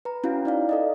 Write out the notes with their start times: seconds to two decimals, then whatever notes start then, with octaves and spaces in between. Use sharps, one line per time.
0.05 B4 A#5
0.24 C#4 E4 F#4 F5
0.45 D#4 D5 F5
0.69 A4 D5 D#5